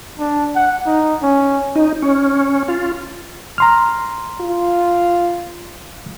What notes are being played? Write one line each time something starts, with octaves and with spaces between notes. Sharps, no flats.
D4
F#5
D#4
C#4
D#4
C#4
F4
A#5 C6 F6
F4